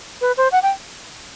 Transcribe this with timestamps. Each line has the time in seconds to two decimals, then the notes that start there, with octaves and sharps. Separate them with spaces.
0.21 B4
0.37 C5
0.52 F#5
0.63 G5